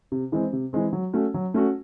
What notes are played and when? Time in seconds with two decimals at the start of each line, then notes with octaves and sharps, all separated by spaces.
0.12 C3
0.32 E3 G#3 C4
0.53 C3
0.73 E3 G#3 C4
0.93 F#3
1.13 A3 C#4 F#4
1.34 F#3
1.54 A3 C#4 F#4